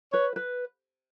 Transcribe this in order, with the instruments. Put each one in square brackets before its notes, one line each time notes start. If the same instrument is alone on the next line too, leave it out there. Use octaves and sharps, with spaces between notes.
[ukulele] B4 [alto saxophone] C#5
[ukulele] B4